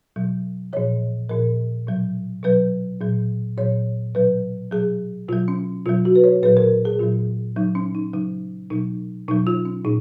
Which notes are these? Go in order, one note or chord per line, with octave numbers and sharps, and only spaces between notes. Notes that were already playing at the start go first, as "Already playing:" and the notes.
B2 F#3
A#2 F3 C#5
A#2 F3 A#4
B2 F#3
B2 F#3 B4
A#2 F#3
A#2 F#3 C#5
B2 F#3 B4
B2 F#3 G#4
B2 F#3 F4
C#4
B2 F#3 F4
F#4
B4
C#5
A#2 F#3 B4
A#4
G#4
A#2 F#3 F4
C#3 F#3 D#4
C#4
D#4
C#3 F#3 D#4
B2 F#3 D#4
B2 F#3 D#4
F4
C#4
A#2 D#4